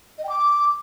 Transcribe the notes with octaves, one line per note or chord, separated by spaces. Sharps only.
D#5
G5
D6